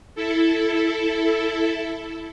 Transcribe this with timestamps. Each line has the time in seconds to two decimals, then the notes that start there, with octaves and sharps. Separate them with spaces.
0.15 E4 A4